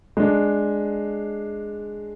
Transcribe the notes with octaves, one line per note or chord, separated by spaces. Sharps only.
G#3 D4